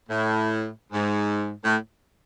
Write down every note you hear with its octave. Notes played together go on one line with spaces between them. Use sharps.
A2
G#2
A2